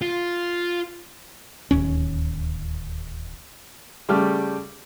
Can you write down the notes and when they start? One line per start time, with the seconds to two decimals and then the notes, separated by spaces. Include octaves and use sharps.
0.02 F4
1.71 D1 D#2 C#4
4.09 C#3 G3 A3 G4 F6